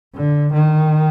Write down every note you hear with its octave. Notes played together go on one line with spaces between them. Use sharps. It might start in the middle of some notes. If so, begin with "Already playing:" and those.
D3
D#3